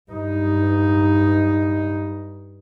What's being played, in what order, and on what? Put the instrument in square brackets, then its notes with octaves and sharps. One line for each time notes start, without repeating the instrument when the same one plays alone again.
[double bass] G2 D#4